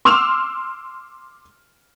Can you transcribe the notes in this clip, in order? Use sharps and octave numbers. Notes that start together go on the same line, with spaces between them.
C6 D6 E6 F6 F7